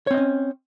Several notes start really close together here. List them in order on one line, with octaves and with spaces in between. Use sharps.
C#5 C4 D#5 C#4